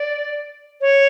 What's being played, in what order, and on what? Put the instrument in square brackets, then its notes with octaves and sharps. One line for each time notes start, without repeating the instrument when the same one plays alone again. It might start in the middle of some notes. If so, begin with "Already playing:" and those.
Already playing: [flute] D5
C#5